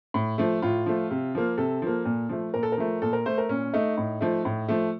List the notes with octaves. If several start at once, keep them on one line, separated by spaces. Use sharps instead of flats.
A2
F3 A3
A2 F4
F3 A3
C3
F3 A#3
C3 A4
F3 A#3
A#2
F3 A3
A#2 A#4
A4
A#4
F3 A3
A#2 A4
A#4
A3 C5
A#4
A#2 C#4
A3 D#4
A2
F3 A3
A2
F3 A3